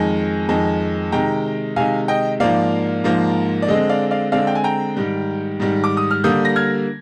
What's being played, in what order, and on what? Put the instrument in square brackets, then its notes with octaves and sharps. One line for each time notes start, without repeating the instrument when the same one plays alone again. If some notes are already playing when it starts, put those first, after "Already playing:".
Already playing: [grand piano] F2 D#3 G#3 G#5
F2 D#3 G#3
C3 D#3 G#3 G5 A#5
C3 D#3 G#3 F5 G#5
D#5 G5
G#2 F3 A#3 D5 F5
G#2 F3 A#3
D5
D3 G#3 C4 D#5
D5 F5
D5 F5
D3 G#3 C4 D5 F5
G5
G#5
G5 A#5
G#2 D#3 G3
G#2 D#3 G3
D6
D#6
F6
D3 G3 A#3 D#6 G6
A#6
F6 G#6